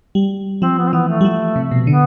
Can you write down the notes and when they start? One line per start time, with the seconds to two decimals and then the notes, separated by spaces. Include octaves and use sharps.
0.15 G3
0.62 F3 C4
0.78 B3
0.87 C4
0.93 E3 B3
1.08 A3
1.21 G3
1.25 F3
1.56 C3
1.71 B2
1.87 D3 B3